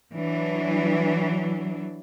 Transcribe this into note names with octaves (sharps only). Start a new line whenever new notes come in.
E3 F#3 D4